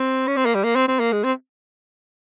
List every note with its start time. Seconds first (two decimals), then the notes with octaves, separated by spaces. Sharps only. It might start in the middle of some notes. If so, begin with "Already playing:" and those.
Already playing: C4
0.27 C#4
0.36 C4
0.46 A#3
0.55 G3
0.64 A#3
0.76 C4
0.88 C4
1.00 A#3
1.12 G#3
1.24 C4